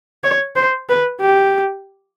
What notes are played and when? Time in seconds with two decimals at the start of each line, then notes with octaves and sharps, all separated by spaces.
0.24 C#5
0.56 C5
0.89 B4
1.21 G4